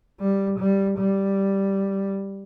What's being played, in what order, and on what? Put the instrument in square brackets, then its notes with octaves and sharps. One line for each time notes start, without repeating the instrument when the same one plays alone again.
[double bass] G3
G3
G3